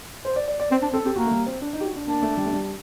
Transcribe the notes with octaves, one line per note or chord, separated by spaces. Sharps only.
C5
D5
D5
D5
C4 C5
D4
C4 A4
C4 G4
A#3 F#4
A3
G3
C4
D4
D#4
G4
F#4
D4
A#3 D4
A3
G3
A3
G3